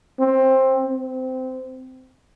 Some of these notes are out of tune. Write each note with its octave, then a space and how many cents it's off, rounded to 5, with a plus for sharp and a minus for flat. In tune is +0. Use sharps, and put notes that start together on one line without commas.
C4 +15
C4 -20